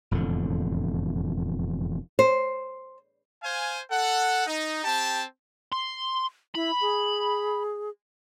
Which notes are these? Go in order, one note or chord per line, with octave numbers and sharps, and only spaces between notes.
E1 F2 A2 D3
C5
C5 F5 G#5
A4 F#5
D#4
C4 G4 A5
C6
E4 B5
G#4